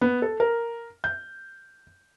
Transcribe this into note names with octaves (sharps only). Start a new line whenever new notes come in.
B3
A4
A#4
G6